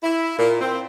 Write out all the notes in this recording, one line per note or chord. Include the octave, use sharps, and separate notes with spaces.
E4
A#2
C4